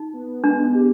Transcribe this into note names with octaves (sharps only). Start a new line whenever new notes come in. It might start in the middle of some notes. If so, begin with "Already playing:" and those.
Already playing: D#4
B3
G#3 D4
G4